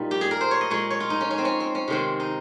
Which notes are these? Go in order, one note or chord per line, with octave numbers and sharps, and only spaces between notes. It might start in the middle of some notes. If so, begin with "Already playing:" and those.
Already playing: A#2 G3 D#4
G4
G#4
A#4
C5
C#5
D#5
A#2 G#3 C#5
C#5
F4
D#4
C#4
C#4
C4
C#4
C4
C#4
C3 D#3 G#3 C4
D#4